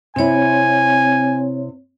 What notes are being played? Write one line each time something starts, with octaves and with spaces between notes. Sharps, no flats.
C3 C4 E4 C#5 G#5